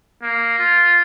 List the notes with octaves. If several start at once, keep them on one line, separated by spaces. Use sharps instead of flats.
A#3
F4